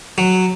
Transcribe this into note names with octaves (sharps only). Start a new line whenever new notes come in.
F#3